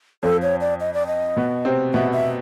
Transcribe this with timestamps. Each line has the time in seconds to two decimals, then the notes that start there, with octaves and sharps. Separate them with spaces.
0.23 F2 F3 A4
0.42 C#5
0.61 D5
0.80 D#5
0.94 D5
1.07 D#5
1.36 B2 B3
1.65 C3 C4
1.94 B2 B3 E5
2.13 E5